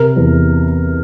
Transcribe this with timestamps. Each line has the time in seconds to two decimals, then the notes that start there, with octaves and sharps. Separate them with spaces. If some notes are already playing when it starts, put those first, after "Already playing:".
Already playing: C3 A#4
0.16 E2